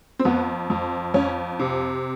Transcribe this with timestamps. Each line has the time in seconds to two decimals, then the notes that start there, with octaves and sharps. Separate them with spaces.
0.19 C4
0.25 F2 B3
0.70 F2
1.14 F2 C#4
1.59 C3